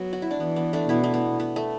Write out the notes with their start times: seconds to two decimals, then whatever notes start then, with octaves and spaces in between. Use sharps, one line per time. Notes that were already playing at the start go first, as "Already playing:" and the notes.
Already playing: F#3 B3
0.13 F#4
0.22 E4
0.31 D4
0.40 E3 B3
0.56 B3
0.73 A3 D4
0.89 B2 B3 E4
1.04 A3
1.14 B3
1.40 B3
1.56 A3